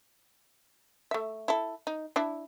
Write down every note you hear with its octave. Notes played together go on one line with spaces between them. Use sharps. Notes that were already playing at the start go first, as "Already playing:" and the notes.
A3 E5
E4 A4
D#4
D4 E4